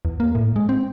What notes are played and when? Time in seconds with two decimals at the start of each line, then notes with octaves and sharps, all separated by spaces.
0.05 E2
0.20 A#3
0.35 A2
0.56 G#3
0.69 C4